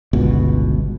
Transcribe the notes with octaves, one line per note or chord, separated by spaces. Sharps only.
G1 C#2 B2